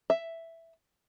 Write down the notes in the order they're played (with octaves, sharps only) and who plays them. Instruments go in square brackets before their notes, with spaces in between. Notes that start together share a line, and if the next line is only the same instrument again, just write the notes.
[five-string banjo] E5